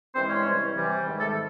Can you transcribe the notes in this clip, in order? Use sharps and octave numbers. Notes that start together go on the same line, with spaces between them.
G2 E3 G#3 C4 C5
C#4 C#5
C3 E3 G3
C3 E3 G3
G#2 D#3 G#3
A3 A4